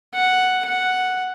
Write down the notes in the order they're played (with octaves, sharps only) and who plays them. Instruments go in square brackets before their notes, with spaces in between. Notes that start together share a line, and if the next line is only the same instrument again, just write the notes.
[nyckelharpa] F#5
F#5